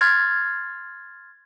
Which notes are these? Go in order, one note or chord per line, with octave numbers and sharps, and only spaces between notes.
C6 F6 G#6 A6